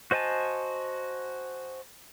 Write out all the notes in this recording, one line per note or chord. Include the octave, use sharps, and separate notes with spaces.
F#4 C5 D#5 G#5 A5